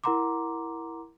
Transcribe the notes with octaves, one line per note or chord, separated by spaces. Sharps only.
E4 A#4 F#5 A#5 C6 D6